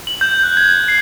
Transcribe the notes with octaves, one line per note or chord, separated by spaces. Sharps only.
F#7
G6
F#6
G#6
C7